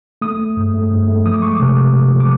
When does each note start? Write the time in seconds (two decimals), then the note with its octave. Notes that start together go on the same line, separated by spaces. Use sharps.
0.22 A3 D#6
0.39 A3
0.57 G2
0.74 A3
0.91 G2
1.08 A3
1.25 F3 D#6
1.34 D6
1.42 G#3 C#6
1.52 D6
1.60 C3
1.77 C3
1.95 C3
2.12 F3
2.20 D6